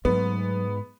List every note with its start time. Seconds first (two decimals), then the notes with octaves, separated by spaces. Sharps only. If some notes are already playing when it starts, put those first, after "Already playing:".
0.05 G#2 F#3 A3 B3